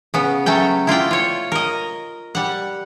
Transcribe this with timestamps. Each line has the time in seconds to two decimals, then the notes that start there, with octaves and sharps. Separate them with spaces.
0.14 C#3 B3
0.46 F#3 A3 C#4 G5
0.87 E4 F4 D5 G5
1.11 F4 C#5
1.52 A#4 D#5
2.35 G3 F#5